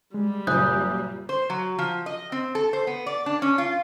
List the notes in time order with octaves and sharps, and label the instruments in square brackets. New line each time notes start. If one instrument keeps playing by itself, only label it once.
[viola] G3 [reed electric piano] G#3
[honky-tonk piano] F#1 F#2 A#2 [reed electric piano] G#5 G6 [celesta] D#6 F#6
[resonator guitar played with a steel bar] C5
F#3
F3
D#5
C4
A4
C5
B3
D5
D4
C#4
F4